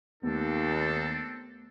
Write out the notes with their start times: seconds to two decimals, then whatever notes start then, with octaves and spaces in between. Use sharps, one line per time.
0.23 D#2 A3 B3 C4 D4 A4